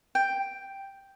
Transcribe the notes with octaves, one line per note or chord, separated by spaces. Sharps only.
G5